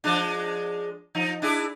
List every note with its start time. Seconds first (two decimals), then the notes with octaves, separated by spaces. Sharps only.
0.04 F3 G#3 D4
1.15 F3 D#4
1.42 D4 E4 G#4